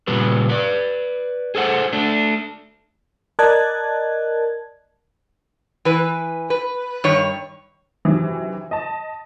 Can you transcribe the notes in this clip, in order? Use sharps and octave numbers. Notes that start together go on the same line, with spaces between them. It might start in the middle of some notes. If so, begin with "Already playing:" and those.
A#2 C#3 G3 B4
B4 D5
G#4 A4 C5 F#5
A3 D4
A#4 D5 D#5 A5 F#6 G#6
E3 B4
B4
G2 D#3 C#5
F#2 C3 D#3 E3
D#5 A5